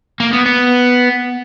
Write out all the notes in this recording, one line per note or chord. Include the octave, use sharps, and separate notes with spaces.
A#3
B3
B3